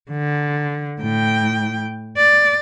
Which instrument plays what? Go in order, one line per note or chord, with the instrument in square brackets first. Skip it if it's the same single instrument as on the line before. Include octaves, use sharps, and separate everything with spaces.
[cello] D3
A2 G5
D5